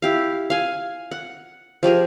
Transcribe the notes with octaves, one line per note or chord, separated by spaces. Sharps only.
E4 G4 F5
F5 G#5
F#5
F3 G4 G#4 A#4